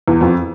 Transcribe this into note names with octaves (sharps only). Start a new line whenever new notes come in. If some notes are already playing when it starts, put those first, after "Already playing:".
E2
F2